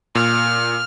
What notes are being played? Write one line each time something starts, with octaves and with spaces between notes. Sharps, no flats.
A#2 F6